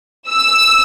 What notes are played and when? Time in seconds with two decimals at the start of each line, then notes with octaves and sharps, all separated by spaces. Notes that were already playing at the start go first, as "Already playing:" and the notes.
0.29 E6